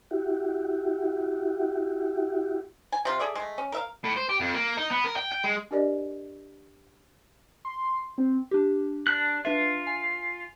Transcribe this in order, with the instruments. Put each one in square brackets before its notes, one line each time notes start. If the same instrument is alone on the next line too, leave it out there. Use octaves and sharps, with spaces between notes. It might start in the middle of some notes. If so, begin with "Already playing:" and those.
[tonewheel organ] E4 F#4 G4
[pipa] G#5
C3 F4
G#4 A4 D5 E5
G#3 A3
C#4
A#4 E5 F5
[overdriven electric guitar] A2
C5
G4
F2
A#3
D#4
B3
A#4
G5
G5
G#3
[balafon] D4 G4 A#4 D5 D#5
[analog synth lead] C6
C4
[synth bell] D4 G4
[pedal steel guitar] D4 F#6 [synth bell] B6
[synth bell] D4 B4 E5 [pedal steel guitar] F4
[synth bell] G#5